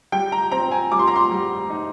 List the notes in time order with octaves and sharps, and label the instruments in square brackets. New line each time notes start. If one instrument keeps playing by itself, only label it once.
[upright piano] G3 G5
A#5
C4 A#5
G#5
G3 D6
C6
A#5
C6
G3
D#4